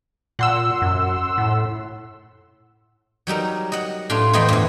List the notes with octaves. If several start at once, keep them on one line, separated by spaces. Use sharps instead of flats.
A#2 F#5 C6 E6
F#2
A2
F#3 G3 D#4 A#4
D#5 F#5
A2 D4 F4
E2 F3 D#5 G5 B5 C6
E2 G2